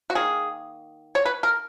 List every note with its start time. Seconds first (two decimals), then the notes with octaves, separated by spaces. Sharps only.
0.10 F#4
0.15 D#3 A#3 G#4
1.15 C#5
1.25 B4
1.43 A#4